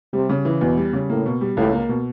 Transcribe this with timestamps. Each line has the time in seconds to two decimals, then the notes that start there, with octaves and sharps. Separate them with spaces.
0.13 C3 G3
0.29 C#3
0.45 E3
0.61 E2 B2
0.77 G3
0.93 C#3
1.09 A2 A#3
1.26 B2
1.41 G3
1.57 C#2 A2
1.73 A#3
1.89 B2